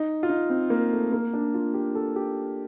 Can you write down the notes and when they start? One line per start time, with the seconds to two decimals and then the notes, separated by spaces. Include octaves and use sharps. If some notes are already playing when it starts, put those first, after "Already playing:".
Already playing: D#4
0.23 F4
0.29 D#4
0.50 C4
0.70 A#3
0.92 A3
1.12 A#3
1.33 D4
1.54 F4
1.74 G4
1.95 A4
2.16 G4